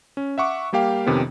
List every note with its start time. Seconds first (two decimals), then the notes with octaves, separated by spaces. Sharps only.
0.17 C#4
0.38 E5 F#5 C#6 D6
0.73 G3 A#3 G4 F5 G5
1.06 F2 C3 D#3 B3 C#4